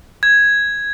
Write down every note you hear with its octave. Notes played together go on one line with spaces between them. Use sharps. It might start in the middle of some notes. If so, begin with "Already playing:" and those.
G#6